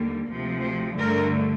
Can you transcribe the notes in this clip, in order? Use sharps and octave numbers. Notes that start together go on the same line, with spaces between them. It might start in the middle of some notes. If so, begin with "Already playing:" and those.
Already playing: D#2 D3 G3 A#3
D2 C3 F3
C5
G2 D3 A3 A#4